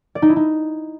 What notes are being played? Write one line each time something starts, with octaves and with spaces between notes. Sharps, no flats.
D5
D#4
E4
D#4